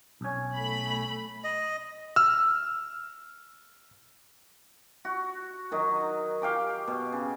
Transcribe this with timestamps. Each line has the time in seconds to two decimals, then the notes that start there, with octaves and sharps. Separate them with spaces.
0.21 B1 C#4
0.56 A3 B5
1.44 D#5
2.16 E6 F6
5.05 F#4
5.71 D#3 F#3 D#4
6.42 G4 F5 G5 D6
6.88 B2
7.12 C#3